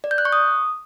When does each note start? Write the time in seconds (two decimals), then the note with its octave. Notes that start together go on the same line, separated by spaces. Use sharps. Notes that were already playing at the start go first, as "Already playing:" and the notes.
0.04 D5
0.11 G6
0.18 F#6
0.25 C#6
0.33 D#6